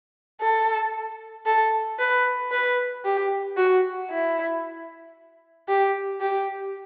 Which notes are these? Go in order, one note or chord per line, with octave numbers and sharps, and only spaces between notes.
A4
A4
B4
B4
G4
F#4
E4
G4
G4